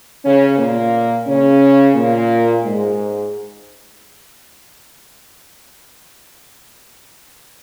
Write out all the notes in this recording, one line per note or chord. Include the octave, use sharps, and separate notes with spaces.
C#3 C#4
A#2 A#3
C#3 C#4
A#2 A#3
G#2 G#3